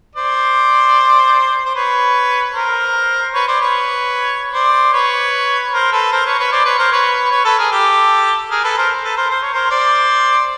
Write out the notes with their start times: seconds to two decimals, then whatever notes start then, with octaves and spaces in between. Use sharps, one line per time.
0.16 C5 D5
1.65 C5
1.75 B4 C#5
2.54 A#4 C5
3.34 B4 C#5
3.47 C5 D5
3.61 B4 C#5
4.53 C5 D5
4.93 B4 C#5
5.73 A#4 C5
5.92 A4 B4
6.12 A#4 C5
6.26 B4 C#5
6.39 B4 C#5
6.52 C5 D5
6.65 B4 C#5
6.78 A#4 C5
6.92 B4 C#5
7.31 B4 C#5
7.44 A4 B4
7.58 G#4 A#4
7.72 G4 A4
8.51 G#4 A#4
8.64 A4 B4
8.77 A#4 C5
9.04 A4 B4
9.17 A#4 C5
9.30 C5
9.42 C#5
9.53 A#4 C5
9.70 C5 D5